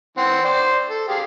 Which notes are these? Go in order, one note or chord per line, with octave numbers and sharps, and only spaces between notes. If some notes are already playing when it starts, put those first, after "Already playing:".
E3 C4 F#5
C5 D5
A4
G4 G#4 F5